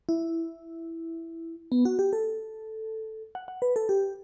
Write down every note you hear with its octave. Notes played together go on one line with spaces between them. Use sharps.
E4
B3
F#4
G4
A4
F#5
F#5
B4
A4
G4